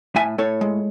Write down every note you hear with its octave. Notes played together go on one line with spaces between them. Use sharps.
A2 E5 G#5
A2 A4 C#5
G#3